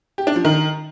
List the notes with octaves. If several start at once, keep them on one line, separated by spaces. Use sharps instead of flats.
G4
D4
F3
D#3